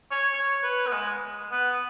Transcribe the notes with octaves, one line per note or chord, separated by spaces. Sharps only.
C#5
C#5
B4
B3
G#3
B3